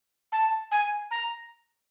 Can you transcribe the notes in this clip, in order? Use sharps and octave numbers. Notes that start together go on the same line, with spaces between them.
A5
G#5
A#5